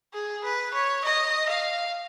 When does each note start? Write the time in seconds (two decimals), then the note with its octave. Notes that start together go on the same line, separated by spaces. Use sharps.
0.14 G#4
0.44 B4
0.74 C#5
1.04 D#5
1.49 F5